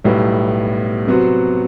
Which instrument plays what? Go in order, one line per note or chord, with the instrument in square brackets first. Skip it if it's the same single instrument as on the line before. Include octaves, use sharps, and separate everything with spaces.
[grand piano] B1 A2 G3 B3
C3 F#3 B3 F#4 C5